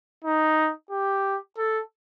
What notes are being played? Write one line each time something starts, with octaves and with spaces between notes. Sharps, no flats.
D#4
G4
A4